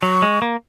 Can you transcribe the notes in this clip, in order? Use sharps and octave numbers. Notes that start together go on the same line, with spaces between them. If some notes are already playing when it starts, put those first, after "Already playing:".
F#3 C#6
G#3
A#3